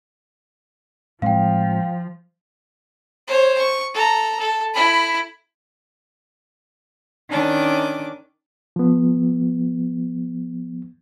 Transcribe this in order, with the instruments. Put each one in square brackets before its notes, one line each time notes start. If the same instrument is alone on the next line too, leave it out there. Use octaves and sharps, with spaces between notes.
[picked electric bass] A2 G#3 C4 [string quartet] F3 [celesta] F5 G5
[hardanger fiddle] C5 C#5
C#6
A4 A#5
A4
E4 B5
[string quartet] D#3 C#4 D4 D6
[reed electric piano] F3 B3